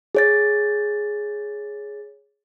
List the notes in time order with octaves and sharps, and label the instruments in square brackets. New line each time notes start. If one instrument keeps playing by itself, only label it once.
[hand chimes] G#4 C#5 A6